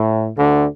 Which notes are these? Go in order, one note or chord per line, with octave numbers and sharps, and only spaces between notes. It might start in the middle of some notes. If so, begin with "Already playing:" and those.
Already playing: A2
D2 D3